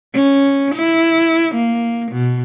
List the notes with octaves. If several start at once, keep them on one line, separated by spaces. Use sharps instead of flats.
C#4
E4
A#3
B2